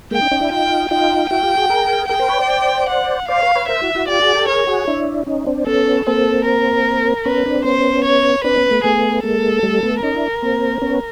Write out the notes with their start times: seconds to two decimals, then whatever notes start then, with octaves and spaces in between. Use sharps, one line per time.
0.11 G#3 A#3 G5
0.21 C#4 D#4
0.31 C#4 D#4
0.41 D4 E4
0.51 D#4 F4 G5
0.91 D#4 F4 G5
1.31 E4 F#4 G5
1.43 F4 G4
1.57 F#4 G#4
1.70 G#4 A#4
2.09 G#4 A#4 G5
2.19 A#4 C5
2.29 B4 C#5
2.39 C5 D5
2.89 F#5
3.28 C5 D5 F5
3.42 B4 C#5
3.55 B4 C#5
3.68 A#4 C5 E5
3.82 E4 F#4
3.95 E4 F#4
4.08 F4 G4 D5
4.21 F#4 G#4
4.34 G4 A4
4.48 G#4 A#4 C#5
4.67 F#4 G#4
4.87 D4 E4
5.26 C#4 D#4
5.46 C4 D4
5.66 B3 C#4 A4
6.06 A#3 C4 A4
6.47 A#4
7.25 B3 C#4 B4
7.46 C4 D4
7.65 B3 C#4 C5
8.04 C#5
8.44 C4 D4 B4
8.57 B3 C#4
8.71 A3 B3
8.84 A3 B3 G#4
9.23 G#3 A#3 A4
9.63 G3 A3
9.83 A3 B3
10.02 C#4 D#4 A#4
10.16 D4 E4
10.42 A#3 C4
10.82 B3 C#4